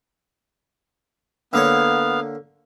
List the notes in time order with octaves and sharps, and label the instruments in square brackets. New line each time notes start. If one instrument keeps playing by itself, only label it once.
[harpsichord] D3 A#3 C#5 [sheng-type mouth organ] B3 F5